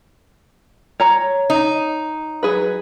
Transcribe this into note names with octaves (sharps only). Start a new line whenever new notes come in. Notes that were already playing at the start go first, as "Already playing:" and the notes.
C#5 A#5
D#4
F#3 G#4 B4